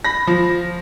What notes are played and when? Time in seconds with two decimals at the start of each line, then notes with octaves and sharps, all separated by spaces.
0.04 B5 A#6
0.27 F3